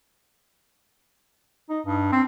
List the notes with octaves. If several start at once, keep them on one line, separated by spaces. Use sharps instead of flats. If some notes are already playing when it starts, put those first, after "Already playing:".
D#4
G2
C4